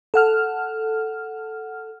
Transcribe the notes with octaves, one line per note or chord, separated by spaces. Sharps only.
A4 F#5 F6